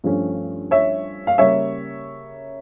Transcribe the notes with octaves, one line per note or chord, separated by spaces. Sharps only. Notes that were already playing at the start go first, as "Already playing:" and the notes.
G2 F3 A3 C#4
C#5 E5
F5
C#3 G3 A#3 C#5 E5